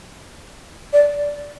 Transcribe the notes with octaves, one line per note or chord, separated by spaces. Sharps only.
D5